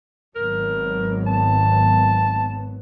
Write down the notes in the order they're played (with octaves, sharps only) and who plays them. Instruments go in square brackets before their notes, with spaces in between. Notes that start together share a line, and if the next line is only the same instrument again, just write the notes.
[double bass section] G#1 F#3 B3 [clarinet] A#4
[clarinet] A5